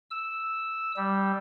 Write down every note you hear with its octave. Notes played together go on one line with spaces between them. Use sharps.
E6
G3